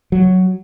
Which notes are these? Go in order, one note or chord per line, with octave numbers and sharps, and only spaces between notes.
F#3